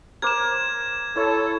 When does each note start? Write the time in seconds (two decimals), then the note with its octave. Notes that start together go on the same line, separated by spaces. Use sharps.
0.22 A#4 C5 D6 G#6 E7
1.16 E4 A4 C#5